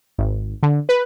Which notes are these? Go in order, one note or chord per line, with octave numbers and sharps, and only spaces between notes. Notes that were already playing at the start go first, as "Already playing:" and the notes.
G#1
D3
B4